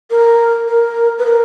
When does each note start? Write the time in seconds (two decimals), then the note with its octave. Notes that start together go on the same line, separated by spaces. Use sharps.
0.11 A#4
0.68 A#4
1.18 B4
1.26 A#4